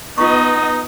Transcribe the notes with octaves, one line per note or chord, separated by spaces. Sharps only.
B3 D#4 F4 D#5 C#6